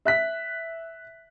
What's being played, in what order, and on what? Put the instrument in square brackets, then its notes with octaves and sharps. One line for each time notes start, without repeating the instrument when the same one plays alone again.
[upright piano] E5 F#6 B6